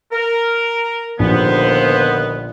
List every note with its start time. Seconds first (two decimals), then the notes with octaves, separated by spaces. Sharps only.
0.12 A#4
1.19 A#1 D#2 D3 B3 C5